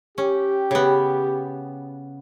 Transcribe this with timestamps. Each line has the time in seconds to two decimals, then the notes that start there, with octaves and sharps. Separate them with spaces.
0.18 C#4 G4
0.71 C#3 B3